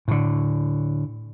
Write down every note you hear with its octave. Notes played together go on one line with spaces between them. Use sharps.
A2 D3